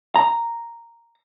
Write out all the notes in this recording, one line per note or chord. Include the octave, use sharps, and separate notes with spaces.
A#5